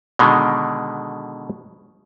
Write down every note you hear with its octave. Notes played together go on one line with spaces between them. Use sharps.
B2 D3 D#3 G#3